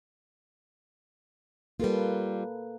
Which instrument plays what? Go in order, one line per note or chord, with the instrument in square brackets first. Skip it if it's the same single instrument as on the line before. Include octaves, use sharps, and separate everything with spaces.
[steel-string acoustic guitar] G3 F4 [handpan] A#3 A4 B4